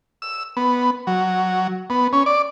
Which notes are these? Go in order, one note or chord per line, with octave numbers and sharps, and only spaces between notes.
E6
B3
F#3
B3
C#4
D5